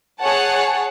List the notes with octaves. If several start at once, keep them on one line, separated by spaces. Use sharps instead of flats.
G#4 C#5 F#5 A5